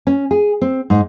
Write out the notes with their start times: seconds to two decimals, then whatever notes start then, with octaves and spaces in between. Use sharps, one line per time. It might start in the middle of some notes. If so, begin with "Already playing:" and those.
0.07 C#4
0.31 G#4
0.61 C4
0.90 G#2